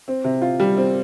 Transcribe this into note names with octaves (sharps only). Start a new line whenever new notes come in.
C4
C3
F4
G3
C4